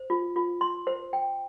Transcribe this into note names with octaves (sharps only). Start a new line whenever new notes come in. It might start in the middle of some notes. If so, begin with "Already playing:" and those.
Already playing: C5
F4
F4
C6
C5
G5